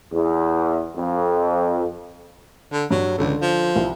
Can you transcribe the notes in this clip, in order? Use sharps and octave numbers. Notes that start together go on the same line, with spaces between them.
E2
F2
D3
G2 F#3
C#2 D3 A4
F3
C2